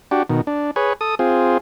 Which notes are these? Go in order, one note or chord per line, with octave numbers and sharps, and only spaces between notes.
D4 F#4 G4
B2 D#3
D4
G#4 B4 C#5
A4 D#6
C4 F4 G#4